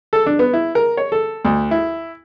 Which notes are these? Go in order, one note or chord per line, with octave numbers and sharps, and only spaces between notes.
A4
D4
B3
E4
A#4
C#5
A4
D2
E4